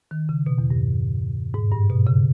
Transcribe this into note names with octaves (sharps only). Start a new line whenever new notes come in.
D#3
C#3
B2
E2
G2
G#2
G2
B2
C#3